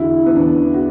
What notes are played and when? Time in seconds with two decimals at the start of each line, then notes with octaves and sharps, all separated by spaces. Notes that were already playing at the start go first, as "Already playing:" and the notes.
Already playing: E2 D3 E4 F#4
0.26 B3
0.36 E2 D4
0.74 F#4